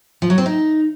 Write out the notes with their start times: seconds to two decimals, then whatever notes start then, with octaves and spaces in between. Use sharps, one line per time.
0.22 F3
0.30 F#3
0.38 C4
0.46 D#4